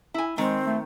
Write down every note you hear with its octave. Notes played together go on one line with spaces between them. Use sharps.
E4 G#5
D#3 G#3 C4
A3